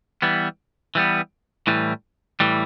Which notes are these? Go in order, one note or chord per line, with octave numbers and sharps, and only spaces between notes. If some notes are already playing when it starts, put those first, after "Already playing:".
E3 G3 B3
E3 G3 B3
A2 E3 G3
A2 E3 G3